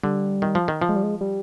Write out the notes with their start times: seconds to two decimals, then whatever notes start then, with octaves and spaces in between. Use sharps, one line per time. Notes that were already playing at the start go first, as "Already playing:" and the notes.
0.03 D3 G3
0.42 D#3
0.55 F3
0.68 D#3
0.82 F3
0.89 G#3
0.96 G3
1.03 G#3
1.21 G3